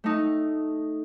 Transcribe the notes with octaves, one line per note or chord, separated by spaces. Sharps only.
A3 D#4